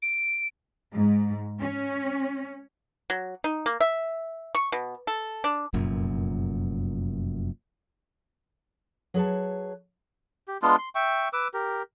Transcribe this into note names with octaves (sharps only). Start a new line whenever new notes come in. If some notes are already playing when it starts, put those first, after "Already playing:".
D7
G#2
C#4
F#3
D#4
A#3
E5
C#6
B2
A4
D4
F1 F#2 A#2
F#3 G#4 B4 C#5 A5
G4
G#3 B3 D4 F4
C6
E5 G5 C#6
B4 D6 E6
G4 A#4